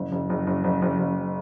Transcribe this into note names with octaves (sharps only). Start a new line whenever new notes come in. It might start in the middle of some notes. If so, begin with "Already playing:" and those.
Already playing: F#1
F#1
F#1
F#1
F#1
F#1
F#1